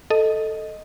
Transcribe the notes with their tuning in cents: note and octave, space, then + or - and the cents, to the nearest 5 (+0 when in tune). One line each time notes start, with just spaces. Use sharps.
A4 +0 D#5 +0